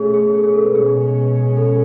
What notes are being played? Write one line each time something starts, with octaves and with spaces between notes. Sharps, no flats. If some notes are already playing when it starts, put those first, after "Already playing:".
Already playing: B2 A3 C#4 G#4
G#4
G#4
G#4
A4
B4
B2 G#3 C#4 G#4
A4